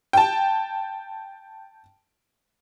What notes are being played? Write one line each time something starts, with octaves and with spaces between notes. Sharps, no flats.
G5 A5